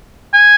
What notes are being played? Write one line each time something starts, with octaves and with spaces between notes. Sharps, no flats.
G#5